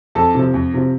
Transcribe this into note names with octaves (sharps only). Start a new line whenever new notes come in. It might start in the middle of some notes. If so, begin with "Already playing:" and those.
F2 A4 A5
C3 F3
F2
C3 F3